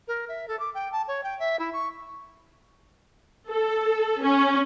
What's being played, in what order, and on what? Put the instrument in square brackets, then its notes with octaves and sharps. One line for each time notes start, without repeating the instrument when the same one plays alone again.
[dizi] A#4
E5
A4
D6
G5
A5
C#5
G5
E5
E4
C#6
[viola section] A4
C#4